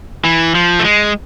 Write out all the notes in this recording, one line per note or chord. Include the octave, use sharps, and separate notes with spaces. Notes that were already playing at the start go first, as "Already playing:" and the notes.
E3
F3
A3
G#3